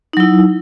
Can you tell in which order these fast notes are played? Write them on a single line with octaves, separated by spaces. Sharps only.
D#4 F#3 E4